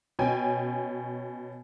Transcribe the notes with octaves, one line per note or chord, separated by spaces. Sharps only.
B2 C#4 G5 G#5